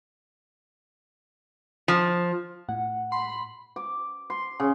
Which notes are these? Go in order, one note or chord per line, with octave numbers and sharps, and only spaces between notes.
F3
A2 F#5
B5 C6
D6
C6
C#3